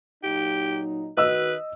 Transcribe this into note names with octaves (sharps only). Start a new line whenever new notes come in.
A#2 F#3 D#4 G4
D#3 F#4 B4 D#5 E6